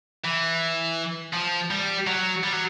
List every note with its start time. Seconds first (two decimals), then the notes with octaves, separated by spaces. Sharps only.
0.24 E3
1.34 F3
1.71 G3
2.07 F#3
2.44 G3
2.53 F#3